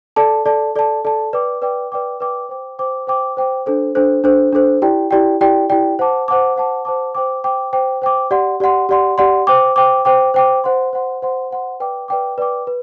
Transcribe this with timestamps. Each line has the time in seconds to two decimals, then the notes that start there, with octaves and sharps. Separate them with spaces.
0.16 A4 D5 A5
0.46 A4 D5 A5
0.76 A4 D5 A5
1.05 A4 D5 A5
1.33 B4 D5 G5 D6
1.62 B4 D5 G5 D6
1.92 B4 D5 G5 D6
2.20 B4 D5 G5 D6
2.49 C5 G5 D6
2.79 C5 G5 D6
3.07 C5 G5 D6
3.37 C5 G5 D6
3.66 D4 A4 C5
3.95 D4 A4 C5
4.24 D4 A4 C5
4.52 D4 A4 C5
4.82 E4 G4 D5 G5
5.11 E4 G4 D5 G5
5.41 E4 G4 D5 G5
5.70 E4 G4 D5 G5
5.99 C5 F#5 A5 D6
6.28 C5 F#5 A5 D6
6.56 C5 F#5 A5 D6
6.85 C5 F#5 A5 D6
7.15 C5 G5 D6
7.44 C5 G5 D6
7.73 C5 G5 D6
8.02 C5 G5 D6
8.31 G4 D5 F#5 C6
8.60 G4 D5 F#5 C6
8.89 G4 D5 F#5 C6
9.18 G4 D5 F#5 C6
9.47 C5 G5 D6
9.76 C5 G5 D6
10.05 C5 G5 D6
10.34 C5 G5 D6
10.64 C5 F#5 C6
10.93 C5 F#5 C6
11.22 C5 F#5 C6
11.51 C5 F#5 C6
11.80 B4 D5 G5 D6
12.08 B4 D5 G5 D6
12.38 B4 D5 G5 D6
12.67 B4